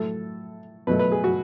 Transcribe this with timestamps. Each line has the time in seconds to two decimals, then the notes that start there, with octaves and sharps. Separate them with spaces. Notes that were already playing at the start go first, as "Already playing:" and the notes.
Already playing: A2 F#3 A3 A4
0.87 B2 F#3 A3 B4
0.99 B4
1.12 G#4
1.24 F#4